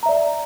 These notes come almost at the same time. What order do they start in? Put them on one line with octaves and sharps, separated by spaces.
A#5 E5 D5